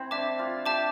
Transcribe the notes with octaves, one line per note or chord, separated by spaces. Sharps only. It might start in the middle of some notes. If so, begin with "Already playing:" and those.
Already playing: C4 E4
D4 E5 A5 D6
F4
G4 E5 A5 D6